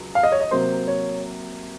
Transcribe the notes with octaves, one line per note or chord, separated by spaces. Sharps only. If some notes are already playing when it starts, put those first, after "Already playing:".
Already playing: C#2 F#3
F5
D#5
C#5
D#5
C3 F#3 A#3 C5
C#5